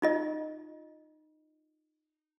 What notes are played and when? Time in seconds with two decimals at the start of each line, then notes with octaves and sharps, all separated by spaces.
0.02 D#4 F4 D#5